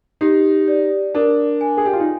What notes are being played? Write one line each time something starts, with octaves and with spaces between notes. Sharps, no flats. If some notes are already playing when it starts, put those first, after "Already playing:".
D#4 G4
D5
D4 A#4
G#5
G#4
G4
F4
D#4